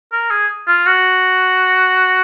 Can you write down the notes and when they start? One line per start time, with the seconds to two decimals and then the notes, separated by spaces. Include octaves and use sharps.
0.12 A#4
0.31 G#4
0.68 F4
0.86 F#4